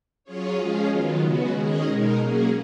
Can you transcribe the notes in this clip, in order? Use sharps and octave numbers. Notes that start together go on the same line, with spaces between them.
F#3 C#4 F4 G#4 C#5
F3 G#3 C#4 F4 G#4
D#3 F#3 B3 F4
C#3 G#3 B3 F#4
D#3 G#3 C#4 G#4 D#5
B2 G#3 D#4 A#4
F#3 A#3 C#4 G#4